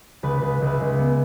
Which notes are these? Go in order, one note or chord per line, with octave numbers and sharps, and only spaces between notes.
C#2 B4
C#2 B4
C#2 B4 E5
C#2
B3